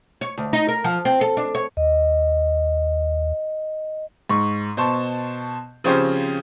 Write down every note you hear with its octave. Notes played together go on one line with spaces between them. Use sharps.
C#5
D2
D#4
A#4
F3
C4
A4
D4
C#5
D#2 D#5
G#2 C#6
B2 C5 A5 C#6
C#3 F3 C4 C#4 G4 C5